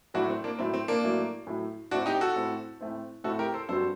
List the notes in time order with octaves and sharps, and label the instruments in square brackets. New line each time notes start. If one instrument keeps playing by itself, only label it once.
[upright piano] A2 F#3 A3 [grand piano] D4 F#4
[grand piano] C4
A#3 D4
[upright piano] A2 F#3 A3 [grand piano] C4
[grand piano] C4
A#3 D4
[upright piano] A2 F#3 A3
A2 F#3 A3
[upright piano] A2 A3 C4 [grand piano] D4 F#4
[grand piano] D#4 G4
F#4 A4
[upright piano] A2 A3 C4
A2 A3 C4
[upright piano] A2 A3 C4 [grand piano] F#4 A4
[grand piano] G4 A#4
A4 C5
[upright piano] G2 F#3 C4 F#4 [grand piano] A4 C5